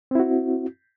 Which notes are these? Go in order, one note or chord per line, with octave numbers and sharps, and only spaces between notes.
C4 E4 F#4